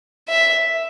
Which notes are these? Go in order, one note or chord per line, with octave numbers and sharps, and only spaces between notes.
E5